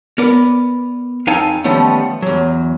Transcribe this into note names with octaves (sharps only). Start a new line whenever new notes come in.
B3 A#4 B4 D5
F2 C4 D#4 F5 G#5 A5
D#3 F3 G3 A3 B3 C#4
E2 F#3